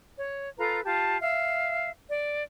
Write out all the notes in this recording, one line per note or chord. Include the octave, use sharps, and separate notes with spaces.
C#5
F4 A4 B4 A#5
F4 G4 A5
E5 F5
D5